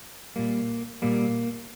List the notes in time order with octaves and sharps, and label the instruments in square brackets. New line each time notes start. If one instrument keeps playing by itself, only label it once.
[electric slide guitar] A#2 G3 A#3
A#2 G3 A#3